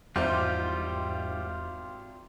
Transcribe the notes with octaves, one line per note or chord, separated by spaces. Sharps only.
G#1 E2 G#2 G3 E4 F4 G4 C5